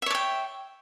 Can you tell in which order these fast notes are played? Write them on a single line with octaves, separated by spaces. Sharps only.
E5 C#5 D5 G5